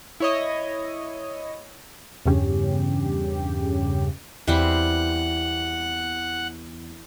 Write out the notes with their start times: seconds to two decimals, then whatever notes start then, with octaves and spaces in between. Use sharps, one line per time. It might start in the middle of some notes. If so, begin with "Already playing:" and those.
0.20 E4 C#5 D#5
2.26 E2 G2 C#3 C#4 G4
4.48 E2 E3 G3 C4 F#5 F#6